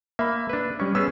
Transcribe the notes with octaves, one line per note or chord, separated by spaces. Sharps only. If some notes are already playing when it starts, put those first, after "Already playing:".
A#3 E5 B5
D4 B4
G3 C#4 C#6
B3 C#4 G#4 E6